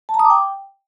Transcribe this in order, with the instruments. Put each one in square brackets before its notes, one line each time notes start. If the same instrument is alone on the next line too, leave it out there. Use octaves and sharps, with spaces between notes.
[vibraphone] A5
A#5
D#6
D6
G5